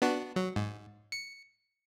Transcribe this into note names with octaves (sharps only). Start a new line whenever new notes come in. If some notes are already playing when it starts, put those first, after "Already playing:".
B3 D4 F#4
F#3
G#2
C#7